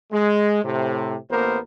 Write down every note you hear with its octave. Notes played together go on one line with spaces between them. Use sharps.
G#3
A2 C3
A1 A#3 B3 A#4 C5